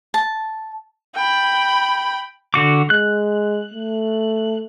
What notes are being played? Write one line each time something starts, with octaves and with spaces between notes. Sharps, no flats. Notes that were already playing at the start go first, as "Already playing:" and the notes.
A5
G5 B5
D3 F#4 D6
G#3 F#6
A3